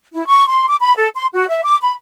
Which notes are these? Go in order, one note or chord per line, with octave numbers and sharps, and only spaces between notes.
E4
C#6
C6
D6
B5
A4
C6
F#4
E5
D6
B5